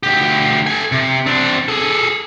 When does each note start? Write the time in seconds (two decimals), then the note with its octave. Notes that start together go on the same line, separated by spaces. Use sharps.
0.03 D2 G4
0.67 A4 G#5
0.92 C3
1.26 C4 D4
1.68 G#4 A4